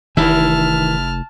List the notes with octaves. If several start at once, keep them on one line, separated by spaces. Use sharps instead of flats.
F1 D#3 E3 E4 A5 F6